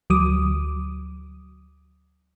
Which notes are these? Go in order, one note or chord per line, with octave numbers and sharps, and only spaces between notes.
D2 F#3 D6 D#6